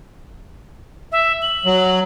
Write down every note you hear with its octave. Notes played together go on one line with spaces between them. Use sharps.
E5
F#7
F#3